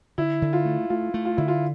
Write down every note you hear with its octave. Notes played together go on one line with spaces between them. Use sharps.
D3 E4
D3
F4
A3
A3 F4
A3
F4
D3 E4
F4